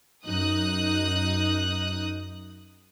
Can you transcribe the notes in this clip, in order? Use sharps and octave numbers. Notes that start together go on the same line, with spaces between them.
F#2 D#4 D#6 F#6